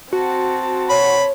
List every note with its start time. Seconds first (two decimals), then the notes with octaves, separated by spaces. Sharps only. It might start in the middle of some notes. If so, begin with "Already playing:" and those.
0.13 C4 F#4 A5
0.89 C#5 B5